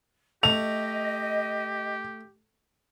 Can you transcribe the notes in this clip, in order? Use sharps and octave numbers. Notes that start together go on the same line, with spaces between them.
A3 G4 D#5 F7